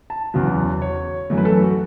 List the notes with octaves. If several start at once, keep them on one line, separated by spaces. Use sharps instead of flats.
A5
E2 C#3 F#3 B3
C#5
F#2 E3 A3
B4
A4
F#4